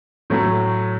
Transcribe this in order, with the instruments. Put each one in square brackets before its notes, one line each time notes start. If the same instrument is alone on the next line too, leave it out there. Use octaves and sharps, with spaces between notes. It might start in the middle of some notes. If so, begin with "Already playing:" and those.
[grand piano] A2 F#3 A3